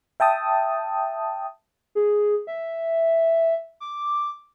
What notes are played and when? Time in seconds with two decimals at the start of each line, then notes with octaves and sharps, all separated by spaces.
0.20 E5 G5 A5 D#6
1.95 G#4
2.47 E5
3.80 D6